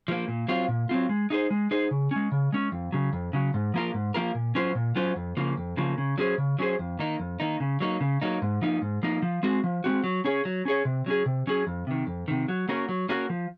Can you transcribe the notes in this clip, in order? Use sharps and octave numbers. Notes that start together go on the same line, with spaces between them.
F3 A#3
A#2
F#3 C4 F4
A#2
F#3 C4 F4
G#3
D#4 G#4 C5
G#3
D#4 G#4 C5
C#3
G#3 C#4
C#3
G#3 C#4
F2
C#3 F#3
F2
C#3 F#3
G#2
F3 A#3 F4 A#4
G#2
F3 A#3 F4 A#4
A#2
F#3 C#4 F4 C5
A#2
F#3 C#4 F4 C5
F2
C#3 F3 A#3
F2
C#3 F3 A#3
C#3
F#3 C#4 G#4 C5
C#3
F#3 C#4 G#4 C5
F2
D#3 A#3 D#4
F2
D#3 A#3 D#4
C#3
F#3 A#3 D#4
C#3
F#3 A#3 D#4
G#2
F3 A#3 D#4
G#2
F3 A#3 D#4
F3
G#3 C4 F#4
F3
G#3 C4 F#4
F#3
C#4 G#4 C#5
F#3
C#4 G#4 C#5
C3
F#3 C#4 G#4
C3
F#3 C#4 G#4
F2
C3 D#3
F2
C3 D#3
F#3
A#3 C#4 F#4 A#4
F#3
A#3 C#4 F#4 A#4
F3